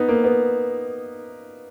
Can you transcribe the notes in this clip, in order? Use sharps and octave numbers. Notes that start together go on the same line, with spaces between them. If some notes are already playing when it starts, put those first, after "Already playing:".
Already playing: B3 D#4
A#3
B3